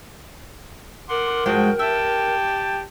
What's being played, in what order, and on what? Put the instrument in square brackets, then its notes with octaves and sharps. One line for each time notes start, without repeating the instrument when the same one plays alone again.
[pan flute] A#4 [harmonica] F#5 C6 D6
[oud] G#2 F3 G#3 [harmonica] F#4 G5
[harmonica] G4 G5 A5 [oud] E5